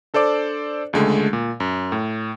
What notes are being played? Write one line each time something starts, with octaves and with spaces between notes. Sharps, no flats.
D4 A4 C5 D5 D6
C#2 D3 G#3 A3
A#2
F#2
A2